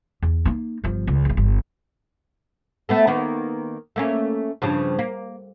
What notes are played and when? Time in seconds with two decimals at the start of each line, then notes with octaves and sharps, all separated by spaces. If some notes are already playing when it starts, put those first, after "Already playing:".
0.22 E2
0.45 A#3 D#4
0.84 G1 F3
1.07 C#2
1.25 F#1 E2
1.37 G1
2.89 A3 B3 A4
3.07 D#3 A#3 B3
3.96 A3 A#3 C#4
4.62 G2 C#3 F3
4.99 A#3